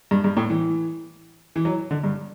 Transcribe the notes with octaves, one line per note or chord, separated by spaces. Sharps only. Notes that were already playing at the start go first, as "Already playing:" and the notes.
G2
G2
A2
E3
E3
F#3
D3
G2